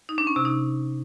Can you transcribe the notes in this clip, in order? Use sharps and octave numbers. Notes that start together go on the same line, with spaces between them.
D#4
D4
C#4
C3
D#4